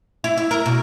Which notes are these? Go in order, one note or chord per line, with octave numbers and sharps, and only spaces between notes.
E4
E4
A#4
B2